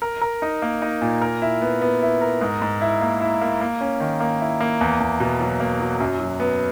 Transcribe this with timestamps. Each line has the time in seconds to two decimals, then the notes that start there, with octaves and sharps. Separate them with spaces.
0.02 A#4
0.21 A#4
0.42 D#4
0.62 A#3
0.82 D#4
1.02 A#2
1.22 A#4
1.42 E4
1.62 B3
1.81 B3
2.02 E4
2.21 A#4
2.41 G#2
2.62 G#2
2.81 E4
3.01 A#3
3.21 E4
3.41 A#3
3.61 A#3
3.81 C#4
4.00 D#3
4.20 A#3
4.40 E4
4.61 A#3
4.81 E2
5.00 E2
5.20 B2
5.41 F#3
5.60 A#3
5.80 F#3
6.00 F#2
6.19 F#3
6.40 B3